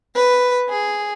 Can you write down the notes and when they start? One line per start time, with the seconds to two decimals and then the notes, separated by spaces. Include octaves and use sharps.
0.15 B4
0.69 G#4